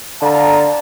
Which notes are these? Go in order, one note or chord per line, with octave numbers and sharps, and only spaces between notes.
D3 F5 A5 A#5